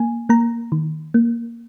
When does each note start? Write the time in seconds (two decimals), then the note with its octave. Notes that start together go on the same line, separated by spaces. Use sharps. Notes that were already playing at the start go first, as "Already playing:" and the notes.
Already playing: A#3 G#5
0.29 A#3 A#5
0.72 D#3
1.14 A#3